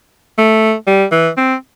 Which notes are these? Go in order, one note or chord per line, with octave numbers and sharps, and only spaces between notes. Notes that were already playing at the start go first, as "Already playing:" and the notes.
A3
G3
E3
C4